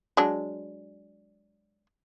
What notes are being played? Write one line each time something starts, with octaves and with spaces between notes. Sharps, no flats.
F#3 G#3 D4